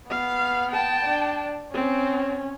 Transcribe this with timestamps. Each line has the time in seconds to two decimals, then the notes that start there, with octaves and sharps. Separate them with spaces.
0.10 B3 F5
0.72 G5 A5
1.04 D4
1.74 C4 C#4